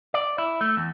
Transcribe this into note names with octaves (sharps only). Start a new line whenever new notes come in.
D5
E4
A3
E2